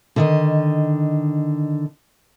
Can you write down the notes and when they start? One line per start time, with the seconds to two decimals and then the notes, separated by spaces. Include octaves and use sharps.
0.16 D3 D#3 D#5